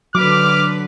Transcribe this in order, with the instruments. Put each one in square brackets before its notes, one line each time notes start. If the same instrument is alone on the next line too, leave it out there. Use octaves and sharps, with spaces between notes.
[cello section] D3 B4 [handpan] F#3 [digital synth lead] D6 [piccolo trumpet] F6